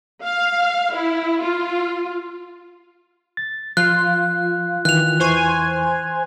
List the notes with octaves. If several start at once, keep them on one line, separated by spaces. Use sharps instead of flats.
F5
E4
F4
A6
F3 F4 F#6
D#3 E3 F#6 F7
E2 E3 C5 G#5 C#6